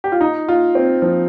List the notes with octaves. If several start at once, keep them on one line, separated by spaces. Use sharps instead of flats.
G4
F4
D#4
F4
C4
F3